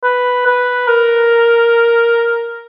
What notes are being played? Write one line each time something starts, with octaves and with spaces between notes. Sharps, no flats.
B4
B4
A#4